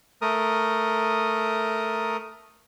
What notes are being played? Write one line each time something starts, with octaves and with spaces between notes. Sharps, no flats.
A3 A#4 D#6